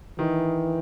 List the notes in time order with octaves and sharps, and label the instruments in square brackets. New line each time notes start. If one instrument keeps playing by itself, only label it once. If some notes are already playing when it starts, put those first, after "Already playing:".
[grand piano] D#3 [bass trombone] E3